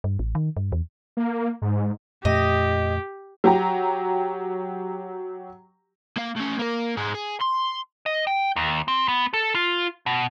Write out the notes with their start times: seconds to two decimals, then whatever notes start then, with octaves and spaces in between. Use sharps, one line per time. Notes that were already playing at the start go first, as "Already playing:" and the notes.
0.04 G2
0.19 A1
0.35 D#3
0.57 G2
0.72 E2
1.17 A#3
1.62 G#2
2.25 F2 A#2 A3 G4 D#5
3.44 F#3 G4 A#5
6.17 A#3 F5
6.36 A2 C#4
6.59 A#3 A#4
6.97 G#2 G#3
7.14 G#4
7.41 C6
8.06 D#5
8.27 G5
8.56 D#2
8.88 C4
9.08 B3
9.34 A4
9.55 F4
10.06 B2